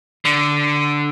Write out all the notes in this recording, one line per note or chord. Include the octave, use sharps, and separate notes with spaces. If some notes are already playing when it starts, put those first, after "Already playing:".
D3